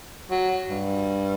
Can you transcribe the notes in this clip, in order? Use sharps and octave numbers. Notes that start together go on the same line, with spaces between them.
F#3
G2